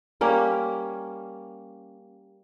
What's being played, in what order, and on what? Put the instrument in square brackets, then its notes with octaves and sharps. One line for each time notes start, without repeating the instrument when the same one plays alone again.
[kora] G3 A#3 C#4